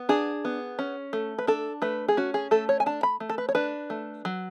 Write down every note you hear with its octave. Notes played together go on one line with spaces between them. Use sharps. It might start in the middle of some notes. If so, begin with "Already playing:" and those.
Already playing: B3
D4 G#4
B3
C#4
A3
B4
D4 A4
A3 B4
G#4
C#4 F#4
G#4
A3 A4
C#5
G#5
D4 A5
B5
A3
A4
B4
C#5
D4 B4
A3
F#3